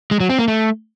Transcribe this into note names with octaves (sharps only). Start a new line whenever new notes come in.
G#3
F#3
C4
A#3
A3